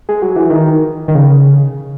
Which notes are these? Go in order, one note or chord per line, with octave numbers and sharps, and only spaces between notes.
G#3
F#3
E3
D#3
D#3
C#3